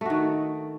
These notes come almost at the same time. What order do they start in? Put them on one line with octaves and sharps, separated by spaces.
A3 F#4 D#3